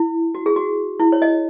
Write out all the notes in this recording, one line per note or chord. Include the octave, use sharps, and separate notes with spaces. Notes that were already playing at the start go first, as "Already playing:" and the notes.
Already playing: E4
F#4
G#4
F#4
E4
C#5
D#5